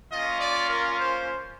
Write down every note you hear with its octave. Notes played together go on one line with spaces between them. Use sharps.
A#3 C#4 F4 D#5
D5
A#4
C5